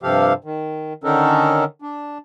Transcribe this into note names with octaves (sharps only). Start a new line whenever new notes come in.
G2 C3 F3 G4 A4 F5
D#3
D3 D#3 C#4 D#4 A4 A#4
D4